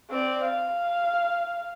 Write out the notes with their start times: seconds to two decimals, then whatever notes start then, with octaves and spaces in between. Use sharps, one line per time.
0.10 C4 D5
0.44 F5